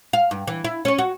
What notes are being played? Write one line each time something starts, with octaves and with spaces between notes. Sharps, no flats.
F5
G2
E3
E4
C#4 C#5
F#4